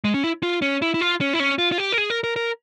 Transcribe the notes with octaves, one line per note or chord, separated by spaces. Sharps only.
G#3
C#4
E4
F4
C#4
E4
E4
F4
C#4
E4
C#4
F4
F4
G4
A#4
G#4
A#4
A#4
A#4